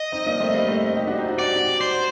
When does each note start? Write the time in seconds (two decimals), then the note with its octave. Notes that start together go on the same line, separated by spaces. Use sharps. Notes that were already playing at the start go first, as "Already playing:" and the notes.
Already playing: D#5
0.12 C4 D#4
0.26 A#3 D4
0.40 A3 C4
0.54 G3 A#3
0.68 A3 C4
0.97 D#4 G4
1.07 D4 F#4
1.18 C4 D#4
1.28 D4 F#4
1.39 F#4 D5
1.47 G4
1.56 D4 F#4
1.81 C5